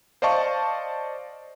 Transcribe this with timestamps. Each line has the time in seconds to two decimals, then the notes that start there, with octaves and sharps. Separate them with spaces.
0.22 C5 D5 D#5 F5 A5 C#6